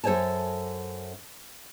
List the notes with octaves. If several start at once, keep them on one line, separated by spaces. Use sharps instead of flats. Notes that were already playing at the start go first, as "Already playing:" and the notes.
F#2 A4 C5 C#5 G#5 A5